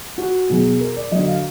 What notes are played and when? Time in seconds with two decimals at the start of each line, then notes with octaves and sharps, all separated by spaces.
0.18 F#4
0.50 B2 F#3 G#4
0.80 A#4
0.96 D5
1.11 D3 F#3 D#5
1.28 F5